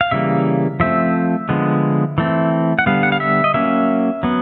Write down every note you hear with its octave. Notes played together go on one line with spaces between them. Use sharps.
F5
C#3 E3 G3 A#3 E5
F3 A3 C4 E5
D3 F3 G#3 B3
E3 A3 C4
F#5
D3 G3 B3 F5
F#5
F5
E5
D#5
F#3 A#3 C#4 E5
F#3 B3